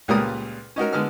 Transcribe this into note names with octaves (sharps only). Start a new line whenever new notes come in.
C#2 A#2 G3 A#4 B4 D#6
C#4 D#4 F#4 A#4
D3 G#3 B3 F6